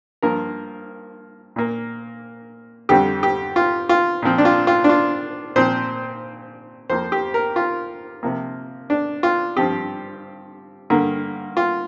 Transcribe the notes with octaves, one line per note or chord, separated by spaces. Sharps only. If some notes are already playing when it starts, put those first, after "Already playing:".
G2 F3 A#3 A#4
A#2 A#3
F2 D3 G3 C4 G4
G4
F4
F4
A#2 F3 C4
D4
F4
F4
D4
F4
A#2 F3 C4 C5
F2 F3 A#3 C5
G4
A#4
F4
C3 F3 A#3
D4
F4
G2 F3 C4 G4
G2 D3 A#3
F4